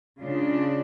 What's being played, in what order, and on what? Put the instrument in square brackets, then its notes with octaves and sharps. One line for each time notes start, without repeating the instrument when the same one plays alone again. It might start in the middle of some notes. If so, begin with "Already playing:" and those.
[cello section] C#3 G#3 D4 F4